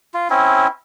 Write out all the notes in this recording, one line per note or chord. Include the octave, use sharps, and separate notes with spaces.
F4
C4 C#4 E4